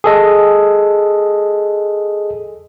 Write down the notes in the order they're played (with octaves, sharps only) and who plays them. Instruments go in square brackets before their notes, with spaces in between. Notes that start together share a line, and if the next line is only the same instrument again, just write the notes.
[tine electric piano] G#4 A4 D#5